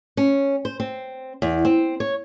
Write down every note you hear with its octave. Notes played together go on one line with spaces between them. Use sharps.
C#4
C5
C4
E2
C4
C#5